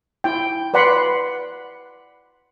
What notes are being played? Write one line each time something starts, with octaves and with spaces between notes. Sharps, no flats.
E4 G5
B4 D5 F#5 B5 C6